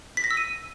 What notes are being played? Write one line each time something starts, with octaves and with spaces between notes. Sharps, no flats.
B6
A#6
E6
D#7